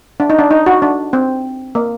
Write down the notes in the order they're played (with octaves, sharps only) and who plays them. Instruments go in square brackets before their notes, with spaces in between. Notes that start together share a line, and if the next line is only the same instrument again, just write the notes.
[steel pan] D4
D#4
D4
D#4
F#4
D4
C4
A#3